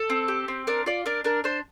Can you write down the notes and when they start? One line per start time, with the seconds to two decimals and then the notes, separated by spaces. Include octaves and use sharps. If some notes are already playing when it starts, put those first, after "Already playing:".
Already playing: A4
0.10 C4
0.28 G4
0.48 C4
0.67 D4 A#4
0.86 F4 D5
1.06 D4 A#4
1.24 D4 A#4
1.44 D4 C5